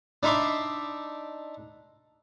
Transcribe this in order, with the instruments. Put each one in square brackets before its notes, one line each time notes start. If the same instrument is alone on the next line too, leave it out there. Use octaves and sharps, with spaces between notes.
[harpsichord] D4 D#4 E5 B5 C6 D6